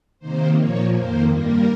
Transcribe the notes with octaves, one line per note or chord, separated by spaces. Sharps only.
C3 D#3 A#3 C5
A#2 F3 A#3 C#5
F2 D#3 A#3 C5
G2 G3 A#3 A#4